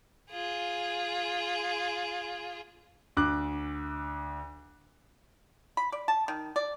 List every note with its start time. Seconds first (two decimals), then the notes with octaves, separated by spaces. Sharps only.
0.31 F4 G#4
3.17 D2 D6 F#6
5.77 B5
5.92 D5
6.08 A5
6.28 D#3
6.56 D5